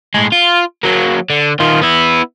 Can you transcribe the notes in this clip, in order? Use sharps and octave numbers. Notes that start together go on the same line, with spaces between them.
A2 G#3
F4
F#3 A#3
D3
D#3 F4
B3 E4